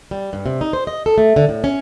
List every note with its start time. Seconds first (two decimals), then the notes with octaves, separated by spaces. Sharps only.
0.11 G3
0.33 G2
0.46 C3
0.61 D#4
0.73 C5
0.87 D#5
1.06 A4
1.18 A3
1.36 D3
1.49 A2
1.64 C#4